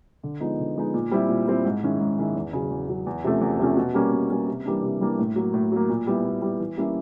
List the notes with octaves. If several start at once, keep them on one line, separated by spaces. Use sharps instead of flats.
D3
F3 G#3 B3 D#4
D3
F3 G#3 B3 D#4
A#2
G3 C4 E4
A#2
G3 C4 E4
G#2
D#3 G#3 C#4 E4
G#2
D#3 G#3 C#4 E4
E2
C#3 F#3
E2
C#3 F#3
E2
C3 F3 A3 C#4
E2
C3 F3 A3 C#4
B2
G3 A#3 C#4
B2
G3 A#3 C#4
C3
E3 G3 A#3 D4
C3
E3 G3 A#3 D4
A2
F#3 A#3
A2
F#3 A#3
A#2
G3 B3 E4
A#2
G3 B3 E4
E3
G3 A#3 C#4 E4